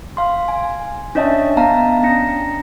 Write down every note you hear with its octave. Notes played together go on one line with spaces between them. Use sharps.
F5 C6
G#5
C#4 D4 C#5 D#5 E5 A5
B3 F5 A5 A#5
C#4 D4 A#5 A#6 C#7